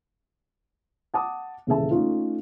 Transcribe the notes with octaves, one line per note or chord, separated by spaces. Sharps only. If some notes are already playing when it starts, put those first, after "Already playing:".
F#5 A5 D6 D#6
D#1 C#3 E3 G#4 E5 A5
A3 C#4 D#4 F4